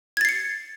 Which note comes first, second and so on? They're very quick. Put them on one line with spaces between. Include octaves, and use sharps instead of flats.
G#6 A6 C7 C#7